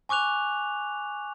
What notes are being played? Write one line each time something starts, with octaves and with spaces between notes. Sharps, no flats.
G#5 C#6 D6 F#6 F7